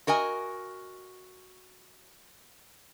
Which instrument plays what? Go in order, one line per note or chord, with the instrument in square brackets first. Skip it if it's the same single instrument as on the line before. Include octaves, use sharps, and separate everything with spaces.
[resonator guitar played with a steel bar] F#4 A#4 D#5 G#5